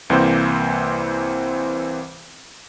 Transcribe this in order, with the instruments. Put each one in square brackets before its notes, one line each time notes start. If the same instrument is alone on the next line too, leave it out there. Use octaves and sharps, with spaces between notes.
[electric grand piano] C2 E3 A#3 C4 C5